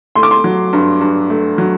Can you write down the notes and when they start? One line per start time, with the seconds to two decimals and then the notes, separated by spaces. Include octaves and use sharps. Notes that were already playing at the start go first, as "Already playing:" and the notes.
0.15 A3 C6
0.23 D6
0.31 C6
0.44 F#3
0.73 G2
1.01 G2
1.30 A3
1.58 F#3